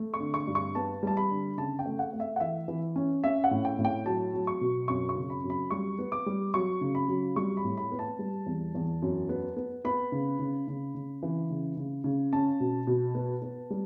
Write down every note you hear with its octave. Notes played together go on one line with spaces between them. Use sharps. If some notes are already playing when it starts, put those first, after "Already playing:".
Already playing: A3
C#6
D3
C#6
G2
C#6
B3 A5
G3 A5
B5
D3
C#3 A5
G5
A3
F#5
A3
E5
F#5
E3 E5
E3
C#4
C#4 E5
F#5
A2
G5
A2
G5
F#3 A5
F#3
C#6
B2
F#2 C#6
C#6
C#3
B5
F#2
B5
G3 C#6
B3
D6
G3
F#3 C#6
C#3
B5
F#3
G3 C#6
B5
A2
B5
B3
A5
G3
E2
E2
F#2
B3
B3
B3 B5
C#3
C#3
C#3
C#3
E3
C#3
C#3
C#3
C#4 A5
B2
B2
B3
B3
G3